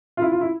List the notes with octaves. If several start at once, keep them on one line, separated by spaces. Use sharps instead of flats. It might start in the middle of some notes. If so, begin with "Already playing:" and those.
F4
E4
F4
E4